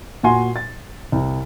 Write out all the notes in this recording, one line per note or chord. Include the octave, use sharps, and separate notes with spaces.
A#2 F#4 G#5 C6
A6
C2